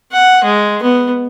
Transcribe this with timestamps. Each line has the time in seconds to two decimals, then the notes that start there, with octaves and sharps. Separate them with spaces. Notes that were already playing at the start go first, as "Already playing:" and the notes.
0.12 F#5
0.44 G#3
0.82 B3